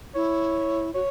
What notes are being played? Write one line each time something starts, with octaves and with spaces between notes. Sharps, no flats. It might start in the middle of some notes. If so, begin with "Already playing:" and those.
E4 C#5
F#4 C#5